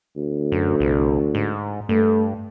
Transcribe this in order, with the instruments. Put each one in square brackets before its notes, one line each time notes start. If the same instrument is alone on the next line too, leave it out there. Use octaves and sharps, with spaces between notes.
[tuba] D2
[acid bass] F#2
C2
G#2
[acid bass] G2 [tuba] A3